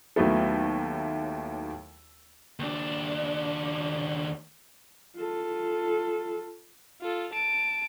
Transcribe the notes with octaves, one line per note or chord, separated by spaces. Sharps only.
D#2 F#3 A3 B3 E4 A4
D#2 D4
F4 A4
F4 A4
A5 D7